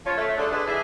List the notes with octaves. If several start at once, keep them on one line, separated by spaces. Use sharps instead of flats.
F3 C#4 F4 C#5
A3
D3 G3 D4 G#4 A4
D4 G#4 B4 D5 D#5
E3 G#4 E5